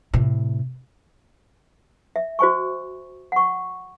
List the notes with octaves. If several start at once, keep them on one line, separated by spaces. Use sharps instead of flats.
A2 C3
E5
F#4 C5 G#5 C#6
F#5 C#6